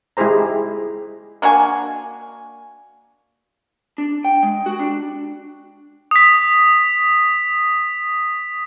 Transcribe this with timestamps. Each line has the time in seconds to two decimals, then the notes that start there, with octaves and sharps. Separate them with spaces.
0.17 G#3 E4 G4 G#4 C5 A#5
1.42 A#3 D4 F#4 G#5
3.98 D4
4.25 G5
4.43 G#3
4.66 F#4
4.79 D4
6.11 D#6 B6